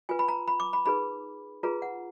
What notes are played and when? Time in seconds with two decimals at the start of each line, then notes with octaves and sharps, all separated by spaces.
0.09 F4 B4 G#5
0.19 B5
0.28 A#5
0.48 B5
0.60 D6
0.73 B5
0.86 D#4 G#4 B4 B5
1.63 F4 G#4 B4 A#5
1.82 F#5